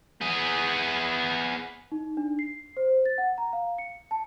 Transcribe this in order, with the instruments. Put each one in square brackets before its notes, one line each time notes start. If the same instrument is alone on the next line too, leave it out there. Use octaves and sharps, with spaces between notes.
[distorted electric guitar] B3 G#4
[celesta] D#4
D4
C7
C5
A6
F#5
A#5
F5
C#7
A5